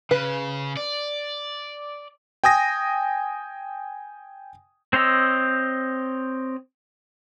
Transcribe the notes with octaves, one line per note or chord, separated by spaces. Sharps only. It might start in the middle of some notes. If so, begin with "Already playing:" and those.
C#3 B4
D5
G5 G#5 D#6 A#6
C4 C5 C#5 D#5 E6